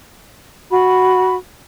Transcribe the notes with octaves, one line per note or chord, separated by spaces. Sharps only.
F#4 B5